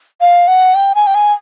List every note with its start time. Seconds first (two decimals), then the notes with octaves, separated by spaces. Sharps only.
0.21 F5
0.48 F#5
0.75 G5
0.95 G#5
1.07 G5
1.15 G#5